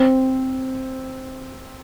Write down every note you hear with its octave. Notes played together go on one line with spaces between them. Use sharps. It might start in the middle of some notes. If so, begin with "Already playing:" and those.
Already playing: C4